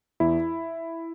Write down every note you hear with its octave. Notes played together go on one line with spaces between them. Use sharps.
E2 E4